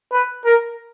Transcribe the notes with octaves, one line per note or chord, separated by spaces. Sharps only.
B4
A#4